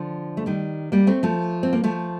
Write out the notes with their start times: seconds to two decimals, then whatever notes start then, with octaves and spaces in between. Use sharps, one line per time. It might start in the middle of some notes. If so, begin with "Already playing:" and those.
Already playing: D3 F3
0.37 A3
0.46 D#3 G3
0.92 G3 A#3
1.07 A3 C4
1.23 F3 A3
1.63 C4
1.73 A#3
1.84 F3 A3